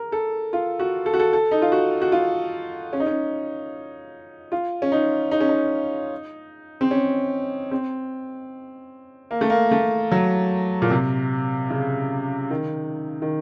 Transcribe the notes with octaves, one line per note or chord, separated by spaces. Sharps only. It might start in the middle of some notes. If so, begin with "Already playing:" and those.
Already playing: A#4
A4
F4
F#4
A4
F#4
A4
A4
D#4
F4
F#4
F#4
F4
C#4
D#4
C#4
F4
C#4
D#4
D#4
C#4
D#4
C4
C#4
C4
A#3
A3
A#3
A3
F#3
A#2
C3
C#3
D#3
D#3